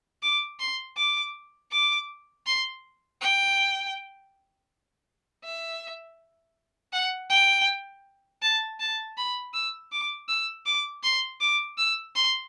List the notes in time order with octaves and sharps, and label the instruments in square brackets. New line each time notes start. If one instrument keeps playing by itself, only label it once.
[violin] D6
C6
D6
D6
C6
G5
E5
F#5
G5
A5
A5
B5
E6
D6
E6
D6
C6
D6
E6
C6